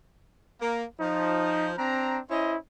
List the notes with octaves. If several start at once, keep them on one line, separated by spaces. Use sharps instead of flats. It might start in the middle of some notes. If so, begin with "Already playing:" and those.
A#3
F3 D#4
C4 D4 A#5
C#4 E4 C5 D#5